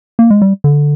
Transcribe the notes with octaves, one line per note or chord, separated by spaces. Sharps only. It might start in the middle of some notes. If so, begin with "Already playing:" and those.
A#3
G#3
G3
D3